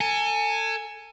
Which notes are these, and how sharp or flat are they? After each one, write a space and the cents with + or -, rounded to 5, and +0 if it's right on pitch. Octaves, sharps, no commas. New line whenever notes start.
A4 +30 G#5 +0